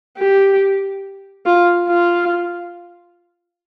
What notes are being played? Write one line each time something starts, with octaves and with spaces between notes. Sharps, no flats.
G4
F4
F4